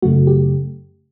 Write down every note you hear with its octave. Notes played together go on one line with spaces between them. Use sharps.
F#2 C#3 F#3 A3 F#4
G4